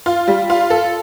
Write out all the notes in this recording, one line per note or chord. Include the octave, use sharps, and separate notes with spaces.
F4
G3
F4
A4